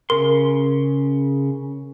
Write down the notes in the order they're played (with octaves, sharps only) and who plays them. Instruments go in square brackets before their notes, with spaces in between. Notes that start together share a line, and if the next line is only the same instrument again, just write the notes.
[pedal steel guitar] C#3 C6 [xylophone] A#4